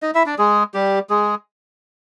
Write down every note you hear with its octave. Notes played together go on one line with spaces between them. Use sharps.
D#4 D#5
E4 E5
D4 D5
G#3 G#4
G3 G4
G#3 G#4